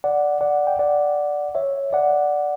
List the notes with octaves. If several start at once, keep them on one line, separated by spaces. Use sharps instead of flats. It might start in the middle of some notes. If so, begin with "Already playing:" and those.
D5 F#5
D5 F#5
G5
D5 F#5
C#5 E5
D5 F#5